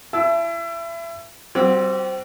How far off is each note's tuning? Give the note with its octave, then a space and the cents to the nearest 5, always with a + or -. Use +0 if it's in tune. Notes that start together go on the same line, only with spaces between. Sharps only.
E4 +30 A5 -30 E6 +0
G3 -30 C4 +0 F#4 -25